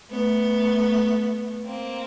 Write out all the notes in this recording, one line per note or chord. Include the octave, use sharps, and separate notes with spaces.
A3 B3
A#3 C4